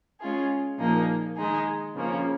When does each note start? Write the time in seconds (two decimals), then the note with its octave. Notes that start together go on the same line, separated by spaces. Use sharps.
0.21 G#3 C#4 F4 G#4
0.78 A#2 F3 A#3 D#4 G#4
1.37 D#3 G#3 D#4 G#4
1.95 C#3 F3 A#3 C#4